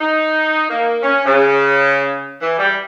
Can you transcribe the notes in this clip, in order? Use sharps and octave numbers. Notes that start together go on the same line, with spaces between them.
D#4
A#3
C#4
C#3
E3
G3